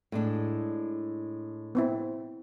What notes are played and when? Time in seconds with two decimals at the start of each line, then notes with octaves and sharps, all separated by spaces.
0.12 A2 G#3 D4
1.75 B3 C4 E4